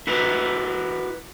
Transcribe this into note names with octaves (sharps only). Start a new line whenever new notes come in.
E4 F#4 A#4 B4